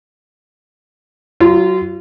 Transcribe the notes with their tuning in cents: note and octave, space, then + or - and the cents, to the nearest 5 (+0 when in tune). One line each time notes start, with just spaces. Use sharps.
F#3 +15 F4 -30